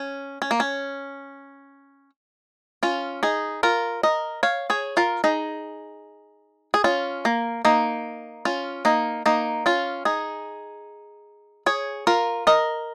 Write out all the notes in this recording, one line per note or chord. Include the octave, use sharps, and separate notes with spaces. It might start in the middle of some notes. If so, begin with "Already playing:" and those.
Already playing: C#4
C#4
A#3
C#4
C#4 F4
D#4 G#4
F4 A#4
A#4 D#5
C#5 F5
G#4 C#5
F4 A#4
D#4 G#4
G#4
C#4 F4
A#3
A#3 D#4
C#4 F4
A#3 D#4
A#3 D#4
C#4 F4
D#4 G#4
G#4 C#5
F4 A#4
A#4 D#5